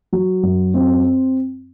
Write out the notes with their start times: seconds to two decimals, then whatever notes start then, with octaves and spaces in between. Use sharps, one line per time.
0.12 F#3
0.43 F#2
0.74 C4